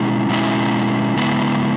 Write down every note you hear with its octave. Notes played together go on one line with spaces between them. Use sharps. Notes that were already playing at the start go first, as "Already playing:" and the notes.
Already playing: B2 G#3 C#4 E4
B2 G#3 C#4 E4
C#3 G#3 B3 E4